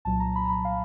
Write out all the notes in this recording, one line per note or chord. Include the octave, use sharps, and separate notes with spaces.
C2 A#2 F#3 A5
A#5
B5
A#5
B5
F5